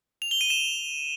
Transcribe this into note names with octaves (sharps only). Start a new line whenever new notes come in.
F7
G7
D#7
E7